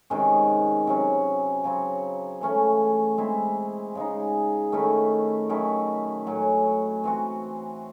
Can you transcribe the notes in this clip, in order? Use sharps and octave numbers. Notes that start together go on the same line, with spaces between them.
C3 D#3 G#3 C#4
C3 F#3 C#4
C#3 F#3 C4
E3 A3 C#4
G#3 C4 E4
C#3 G#3 D#4
D#3 A3 C#4 E4
D#3 F#3 C#4 E4
A2 F#3 C#4
E3 C4 F#4